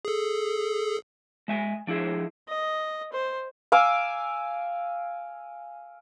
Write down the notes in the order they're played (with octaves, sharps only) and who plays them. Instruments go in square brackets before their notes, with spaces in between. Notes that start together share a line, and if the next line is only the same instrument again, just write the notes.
[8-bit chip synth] G#4 A4
[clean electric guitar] G#3 E5 G#5
F3 D4 E4 G#4 E5
[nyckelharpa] D#5
C5
[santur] F5 G#5 D6 E6